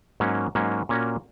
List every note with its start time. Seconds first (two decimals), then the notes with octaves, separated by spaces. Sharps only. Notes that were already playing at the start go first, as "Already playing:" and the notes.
0.20 G#2 F#3 A#3 C#4
0.55 G#2 F#3 A#3 C#4
0.89 A#2 A#3 C#4 F#4